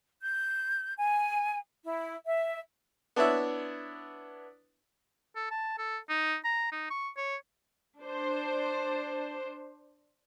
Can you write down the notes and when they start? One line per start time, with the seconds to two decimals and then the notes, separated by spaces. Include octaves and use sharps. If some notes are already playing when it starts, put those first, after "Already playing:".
0.22 G6
0.97 G#5
1.85 E4
2.26 E5
3.16 B3 D4 E4 C#5 E5
5.36 A4
5.51 A5
5.78 A4
6.09 D#4
6.45 A#5
6.72 D#4
6.90 C#6
7.17 C#5
8.00 D4 C5